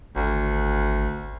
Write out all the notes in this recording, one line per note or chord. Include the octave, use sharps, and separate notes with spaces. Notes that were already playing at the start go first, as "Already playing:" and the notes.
G#1 D2